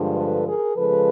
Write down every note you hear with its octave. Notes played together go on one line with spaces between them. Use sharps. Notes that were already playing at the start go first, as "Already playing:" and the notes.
Already playing: G2 D3 F3 G#3
A4 B4
G#4 A#4
C#3 F3 G#3 A4 B4